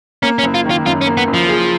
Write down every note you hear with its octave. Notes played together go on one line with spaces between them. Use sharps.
A#3 C#4
C#4
F#1
F4
D#3
F4
F#2 F4
C#4
A#3
B3
F#1
F3
G#4